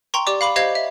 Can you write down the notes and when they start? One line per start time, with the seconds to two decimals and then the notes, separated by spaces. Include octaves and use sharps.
0.14 G5 A#5 C6 C#6
0.27 G4 D5 D6
0.41 F5 B5 D6 F#7
0.56 G4 C5 D#5 F5 G#6 C7
0.75 E5